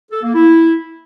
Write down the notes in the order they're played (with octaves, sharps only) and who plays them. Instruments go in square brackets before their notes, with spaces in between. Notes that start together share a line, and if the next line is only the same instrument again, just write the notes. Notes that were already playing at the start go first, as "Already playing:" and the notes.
[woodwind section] A4
A#3
E4